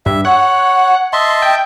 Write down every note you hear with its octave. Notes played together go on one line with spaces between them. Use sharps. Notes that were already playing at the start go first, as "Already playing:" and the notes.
G2 E5
C#5 F#5
D#5 E5 A5 C6
G5